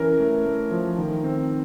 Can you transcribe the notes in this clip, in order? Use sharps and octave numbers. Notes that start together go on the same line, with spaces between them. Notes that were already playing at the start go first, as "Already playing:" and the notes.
Already playing: E3 C#4 A#4
A3
A3
F3
D#3
C4